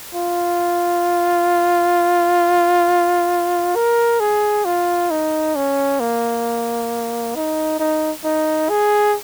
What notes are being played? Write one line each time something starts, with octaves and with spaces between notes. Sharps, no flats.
F4
A#4
G#4
F4
D#4
C#4
A#3
D#4
D#4
D#4
G#4